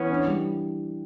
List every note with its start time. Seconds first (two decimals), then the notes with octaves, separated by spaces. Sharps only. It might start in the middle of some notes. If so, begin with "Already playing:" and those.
Already playing: E3 B3 C#4
0.10 D4
0.27 G3